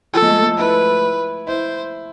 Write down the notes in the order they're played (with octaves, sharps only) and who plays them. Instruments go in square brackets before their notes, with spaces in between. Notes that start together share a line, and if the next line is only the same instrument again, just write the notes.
[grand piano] F3 [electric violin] A4
[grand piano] G#3
A3
G#3
[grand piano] E4 [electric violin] B4
[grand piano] E4 [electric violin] C5